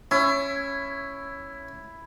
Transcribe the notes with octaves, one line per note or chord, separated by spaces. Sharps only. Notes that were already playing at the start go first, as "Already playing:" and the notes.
C#4 E4